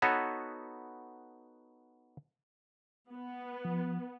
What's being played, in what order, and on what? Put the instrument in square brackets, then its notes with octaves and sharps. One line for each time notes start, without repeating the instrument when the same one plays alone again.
[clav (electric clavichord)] B3 D#4 F#4 A4 B4 C#5
[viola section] B3
[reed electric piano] F3